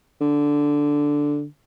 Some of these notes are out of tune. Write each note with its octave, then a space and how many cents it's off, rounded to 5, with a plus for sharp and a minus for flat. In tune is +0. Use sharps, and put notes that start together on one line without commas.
D3 -5